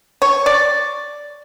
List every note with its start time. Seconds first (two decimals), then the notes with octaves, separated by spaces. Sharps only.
0.22 C#5
0.46 D5